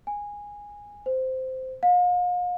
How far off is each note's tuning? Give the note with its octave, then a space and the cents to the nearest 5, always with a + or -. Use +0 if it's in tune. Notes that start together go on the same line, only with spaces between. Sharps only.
G#5 -15
C5 -10
F5 +40